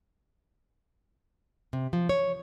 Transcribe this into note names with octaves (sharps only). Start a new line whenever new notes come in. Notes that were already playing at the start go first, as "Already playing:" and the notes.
C3
F3
C#5